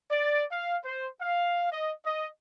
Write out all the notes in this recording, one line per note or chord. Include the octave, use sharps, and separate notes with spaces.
D5
F5
C5
F5
D#5
D#5